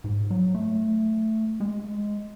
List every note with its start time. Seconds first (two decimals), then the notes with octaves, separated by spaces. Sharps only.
0.04 G#2
0.30 F#3
0.54 A3
1.60 G#3